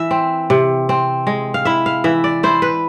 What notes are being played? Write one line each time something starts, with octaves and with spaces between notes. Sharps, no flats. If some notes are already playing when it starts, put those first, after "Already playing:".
Already playing: E3 E5
C4
C3
C4
G#3
F5
E4 E5
F5
E3 E5
D5
E4 C5
B4